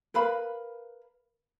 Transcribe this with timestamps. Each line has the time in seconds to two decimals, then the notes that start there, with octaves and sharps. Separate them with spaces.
0.14 A#4 B4 F5 B5